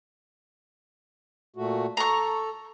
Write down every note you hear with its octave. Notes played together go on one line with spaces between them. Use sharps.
A#2 A3 F#4
A4 A#5 C#6